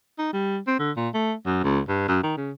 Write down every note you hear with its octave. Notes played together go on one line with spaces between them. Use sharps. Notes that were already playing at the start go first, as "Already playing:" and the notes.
D#4
G3
C4
D3
A#2
A3
F#2
C#2
G2
F#2
D#3
C#3